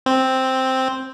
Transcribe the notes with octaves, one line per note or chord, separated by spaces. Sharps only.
C4